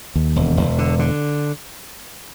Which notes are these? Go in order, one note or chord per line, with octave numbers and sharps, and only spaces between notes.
D#2
E1
E1
D3
D3